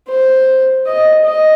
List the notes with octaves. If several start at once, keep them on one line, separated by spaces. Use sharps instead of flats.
C5
D#5
D#5